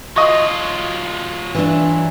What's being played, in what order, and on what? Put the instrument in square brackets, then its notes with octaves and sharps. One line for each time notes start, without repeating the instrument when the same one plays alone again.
[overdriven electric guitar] F#3 F4 [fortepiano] D#5 C#6
[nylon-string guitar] E3 D4